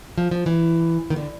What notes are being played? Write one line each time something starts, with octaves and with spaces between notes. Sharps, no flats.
F3
F3
E3
D#3
D3